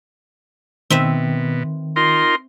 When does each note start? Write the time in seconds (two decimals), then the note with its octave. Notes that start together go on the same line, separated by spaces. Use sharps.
0.90 B2 D#3 C4 B4 E5
1.96 D#4 F4 A#4 C6